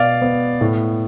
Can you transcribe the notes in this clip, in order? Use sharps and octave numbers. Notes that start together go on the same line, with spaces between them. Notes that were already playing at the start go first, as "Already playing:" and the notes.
Already playing: B2 D5 F5
B3
A2